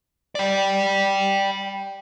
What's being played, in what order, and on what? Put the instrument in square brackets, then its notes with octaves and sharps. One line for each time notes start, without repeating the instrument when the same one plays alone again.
[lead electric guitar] D5 G5